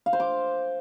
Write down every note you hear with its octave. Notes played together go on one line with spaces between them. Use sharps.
F5
C5
D6